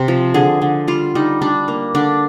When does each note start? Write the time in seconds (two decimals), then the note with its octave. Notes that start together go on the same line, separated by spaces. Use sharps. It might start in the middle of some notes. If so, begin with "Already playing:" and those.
Already playing: C3
0.08 F3
0.34 D3 G#4
0.62 D3
0.88 G3 F4
1.15 G3 D#4
1.41 G3 D4
1.68 A#3
1.95 D3 D4